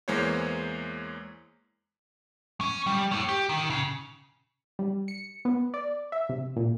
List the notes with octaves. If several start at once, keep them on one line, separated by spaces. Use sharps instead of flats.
E2 E3 G#3 A#3 C5 C#5
C#4
G3
C#5 G5
G4
D#3
C#3
G3
C#7
B3
D5
E5
C3
A#2